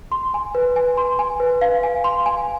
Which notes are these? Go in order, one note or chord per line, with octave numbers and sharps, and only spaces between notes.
C6
G#5
B4
G#5
C6
G#5
B4
F5
G#5
C6
G#5